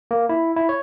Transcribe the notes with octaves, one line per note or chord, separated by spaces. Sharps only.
A#3
E4
E4
C#5